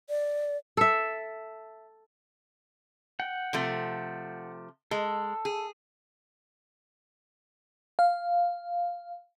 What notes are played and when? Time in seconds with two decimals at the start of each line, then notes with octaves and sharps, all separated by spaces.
0.09 D5
0.77 A4 E5
3.20 F#5 G5
3.53 C3 F3 A3
4.91 G#3 A4
5.45 G#4
7.99 F5